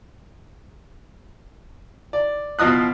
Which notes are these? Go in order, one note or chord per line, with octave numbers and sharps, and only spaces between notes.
D5
B2 F3 D#5 D#6 F#6